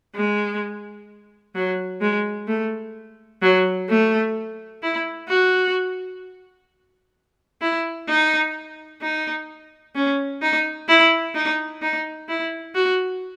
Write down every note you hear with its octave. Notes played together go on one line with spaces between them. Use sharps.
G#3
F#3
G#3
A3
F#3
A3
E4
F#4
E4
D#4
D#4
C#4
D#4
E4
D#4
D#4
E4
F#4